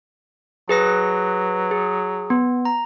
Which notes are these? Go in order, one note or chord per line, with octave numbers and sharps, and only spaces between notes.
F#3 G#4 B4 A#6
G#4
B3
A#5